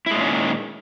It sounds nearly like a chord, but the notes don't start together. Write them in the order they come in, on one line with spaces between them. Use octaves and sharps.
E4 G#3 A#2 C#4 D#3